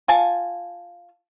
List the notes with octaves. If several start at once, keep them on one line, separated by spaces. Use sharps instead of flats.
F4 G#5 A5